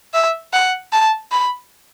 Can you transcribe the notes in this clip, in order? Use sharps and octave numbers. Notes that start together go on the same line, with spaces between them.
E5
F#5
A5
B5